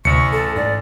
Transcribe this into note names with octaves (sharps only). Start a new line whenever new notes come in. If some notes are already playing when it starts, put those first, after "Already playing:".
A1 D2 C3 C#6 C#7
A4
G#2 D5 A#6